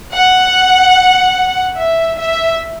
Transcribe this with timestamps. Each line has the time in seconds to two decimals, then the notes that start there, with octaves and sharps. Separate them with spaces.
0.14 F#5
1.77 E5
2.18 E5